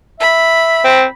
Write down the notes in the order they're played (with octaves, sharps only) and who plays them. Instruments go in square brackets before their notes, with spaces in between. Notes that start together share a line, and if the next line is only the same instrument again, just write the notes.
[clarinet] E5 [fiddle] B5
[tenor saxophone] C4